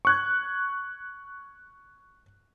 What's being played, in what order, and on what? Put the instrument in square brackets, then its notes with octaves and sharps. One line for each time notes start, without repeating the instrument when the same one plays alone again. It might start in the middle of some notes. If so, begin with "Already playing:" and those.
[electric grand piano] C#6 F#6 G#6